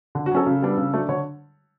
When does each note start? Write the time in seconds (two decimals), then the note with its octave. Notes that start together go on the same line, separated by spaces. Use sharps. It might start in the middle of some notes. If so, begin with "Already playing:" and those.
0.15 D3
0.26 F#4
0.31 F#3 C#4 A4
0.47 C#3
0.62 G3 B3 D4
0.77 C#3
0.93 F#3 A3 D4
1.09 D3 C#5